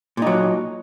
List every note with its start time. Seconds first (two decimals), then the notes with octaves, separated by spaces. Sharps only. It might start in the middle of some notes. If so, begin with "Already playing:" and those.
0.17 A#2
0.22 D#4
0.27 F#3